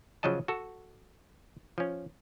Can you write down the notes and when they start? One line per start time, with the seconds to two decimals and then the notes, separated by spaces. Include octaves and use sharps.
0.23 C#3 F3 F#3 D#5 A5
0.48 F#4 A4
1.78 F3 C#4